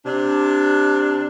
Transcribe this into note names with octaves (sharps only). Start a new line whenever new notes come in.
C3 D4